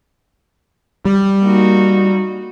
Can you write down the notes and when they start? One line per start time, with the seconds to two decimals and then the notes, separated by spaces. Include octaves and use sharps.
1.05 G3
1.42 A#3 D#4 F#4